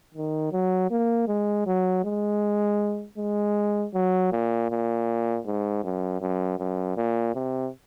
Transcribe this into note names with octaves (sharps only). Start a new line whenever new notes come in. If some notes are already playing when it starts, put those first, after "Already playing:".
D#3
F#3
A#3
G#3
F#3
G#3
G#3
F#3
A#2
A#2
G#2
F#2
F#2
F#2
A#2
C3